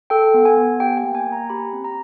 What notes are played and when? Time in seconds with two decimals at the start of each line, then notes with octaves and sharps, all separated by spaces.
0.10 A4 G5
0.34 B3
0.45 G#5
0.57 B3
0.80 G4 G5
0.98 G5
1.03 A#3
1.15 G#5
1.26 A#3
1.32 A#5
1.50 G4 B5
1.73 C4
1.84 A#5